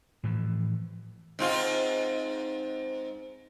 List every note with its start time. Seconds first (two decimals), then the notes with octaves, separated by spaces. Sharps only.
0.23 A2 E3 F3
1.39 G#2 C4 F4